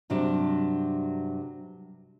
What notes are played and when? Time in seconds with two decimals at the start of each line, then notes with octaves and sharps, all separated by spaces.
0.10 G2 C3 F#3 G3 D4